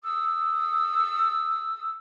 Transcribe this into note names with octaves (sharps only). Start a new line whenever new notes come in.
D#6 E6